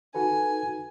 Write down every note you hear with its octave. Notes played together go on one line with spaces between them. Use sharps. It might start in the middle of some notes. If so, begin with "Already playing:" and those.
D#4 F#4 A4 B4 G#5